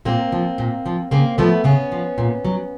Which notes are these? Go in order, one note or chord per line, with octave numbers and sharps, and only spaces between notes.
A#2 A#3 C4
F3
A#2
F3
C#3 A#3 C4
F3 A3 B3
C#3 B3 C#4
F3
A#2
F#3